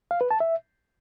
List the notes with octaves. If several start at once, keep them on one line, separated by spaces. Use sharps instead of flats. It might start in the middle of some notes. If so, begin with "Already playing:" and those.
F5
B4
A5
E5